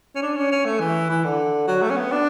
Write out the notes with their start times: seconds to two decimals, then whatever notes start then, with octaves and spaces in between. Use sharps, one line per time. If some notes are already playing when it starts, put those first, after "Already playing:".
0.15 C#4
0.22 D4
0.37 C#4
0.52 C#4
0.65 A3
0.80 E3
1.10 E3
1.24 D3
1.68 F#3
1.82 A3
1.90 C#4
1.96 B3
2.12 D4